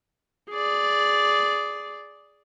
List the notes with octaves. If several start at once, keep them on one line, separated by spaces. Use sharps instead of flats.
G#4 D5